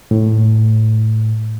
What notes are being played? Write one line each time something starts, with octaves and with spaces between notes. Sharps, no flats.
A2